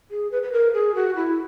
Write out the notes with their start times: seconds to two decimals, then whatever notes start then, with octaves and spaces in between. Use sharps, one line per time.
0.11 G#4
0.31 B4
0.43 B4
0.52 A#4
0.73 G#4
0.95 F#4
1.16 E4